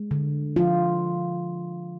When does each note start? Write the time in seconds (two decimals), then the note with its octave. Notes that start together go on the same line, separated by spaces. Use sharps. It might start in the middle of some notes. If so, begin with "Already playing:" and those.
Already playing: G#3
0.11 D3
0.56 F3 F4